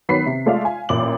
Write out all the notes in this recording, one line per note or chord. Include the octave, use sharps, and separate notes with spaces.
D#3 F#3 B3 B4 B6 C7
C3
G#3 A3 F4 D5 E5 F5
F5 G#5
A1 A#2 D6 F#7